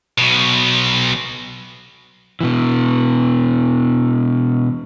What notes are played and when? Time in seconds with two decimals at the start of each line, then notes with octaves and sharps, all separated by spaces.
0.18 B1 B2
2.41 B2 E3